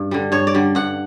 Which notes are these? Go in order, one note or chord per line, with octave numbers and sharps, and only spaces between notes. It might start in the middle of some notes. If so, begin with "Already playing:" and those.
Already playing: G2
D3 G3
G2 C#5
D5
D3 G3
G2 F#5